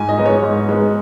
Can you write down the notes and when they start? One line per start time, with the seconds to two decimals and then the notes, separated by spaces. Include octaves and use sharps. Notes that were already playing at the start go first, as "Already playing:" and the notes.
Already playing: G#2 G#5
0.09 D#5
0.17 G#3 B3 D#4
0.26 C#5
0.42 G#2
0.69 G#3 B3 D#4